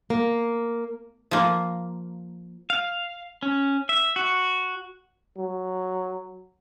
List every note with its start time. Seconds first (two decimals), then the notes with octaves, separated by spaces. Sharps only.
0.10 A#3
1.31 F3 A#3
2.70 F5
3.42 C#4
3.89 E5
4.16 F#4
5.38 F#3